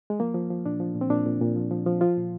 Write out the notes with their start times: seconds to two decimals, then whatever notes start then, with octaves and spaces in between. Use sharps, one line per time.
0.10 G#3
0.20 F3 A#3
0.34 F3
0.51 F3
0.66 A#2 D4
0.80 F3
0.95 A#2
1.01 C4
1.10 A#2 D4
1.26 A#2
1.41 A#2
1.56 F3
1.71 F3
1.86 F3
2.01 F3 F4
2.17 A#2